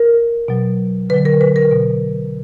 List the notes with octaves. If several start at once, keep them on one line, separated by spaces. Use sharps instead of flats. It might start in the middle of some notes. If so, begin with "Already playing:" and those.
Already playing: A#4
B2 F#3
D3 F#3 B4
A#4
B4
A#4
B2 F#3